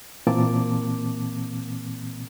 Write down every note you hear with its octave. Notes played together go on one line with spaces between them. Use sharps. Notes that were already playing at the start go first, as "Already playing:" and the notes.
A#2 E3 A#3 C4 A5 D6